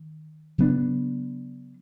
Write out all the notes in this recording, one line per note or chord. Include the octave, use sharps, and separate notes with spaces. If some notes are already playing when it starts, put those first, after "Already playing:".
Already playing: D#3
C#3 F#3 B3 D4